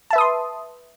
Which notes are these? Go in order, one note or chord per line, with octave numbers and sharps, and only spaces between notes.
B4 E5 A5 C6 D#6